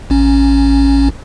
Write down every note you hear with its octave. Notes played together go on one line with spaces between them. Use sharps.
A1 C#4